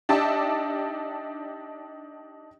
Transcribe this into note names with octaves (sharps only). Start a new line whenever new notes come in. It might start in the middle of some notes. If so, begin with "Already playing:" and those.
D4 D#4 G4 D5 E5 A5